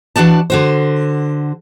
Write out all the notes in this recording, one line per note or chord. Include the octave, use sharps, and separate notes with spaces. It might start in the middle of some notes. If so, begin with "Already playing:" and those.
E3 D4 F#4 D5 A5
D3 F#4 C5